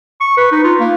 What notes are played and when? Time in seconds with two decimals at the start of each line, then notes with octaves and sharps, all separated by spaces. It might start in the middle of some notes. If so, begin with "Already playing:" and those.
0.21 C#6
0.37 B4
0.52 D#4
0.64 F4
0.80 A#3